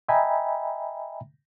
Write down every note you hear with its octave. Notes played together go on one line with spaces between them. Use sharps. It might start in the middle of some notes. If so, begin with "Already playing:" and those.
D#5 E5 G5 G#5 A#5 B5